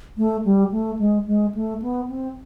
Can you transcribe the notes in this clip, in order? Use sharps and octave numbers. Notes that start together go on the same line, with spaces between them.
A3
G3
A3
G#3
G#3
A3
B3
C4